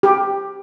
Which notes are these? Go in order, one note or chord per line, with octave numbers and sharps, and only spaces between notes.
G4